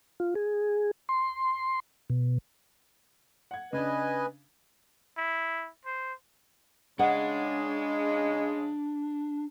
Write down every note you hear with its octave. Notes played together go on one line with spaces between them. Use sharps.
F4
G#4
C6
B2
F#5 G#6
C#3 D4 B4 D#5 G#5
E4
C5
C#3 G#3 D4 D5 F#5